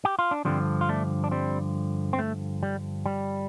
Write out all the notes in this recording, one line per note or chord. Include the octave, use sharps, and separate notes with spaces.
G4
F4
D4
G2 D3 F3 G3 C4
F4
A3 D4
D4
G3 C4
C4
A3
G3
G3